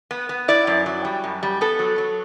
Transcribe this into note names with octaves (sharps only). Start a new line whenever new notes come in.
B3
B3
E4 D5
F#2
F#3
G3
F#2
G3
B3 A4
F#3
F#3